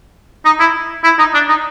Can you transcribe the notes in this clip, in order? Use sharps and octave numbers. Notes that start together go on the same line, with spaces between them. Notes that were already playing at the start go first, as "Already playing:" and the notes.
D#4
E4
E4
D#4
D4
D#4